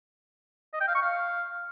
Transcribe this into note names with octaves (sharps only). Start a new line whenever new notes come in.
D#5
G5
F5
C#6
F5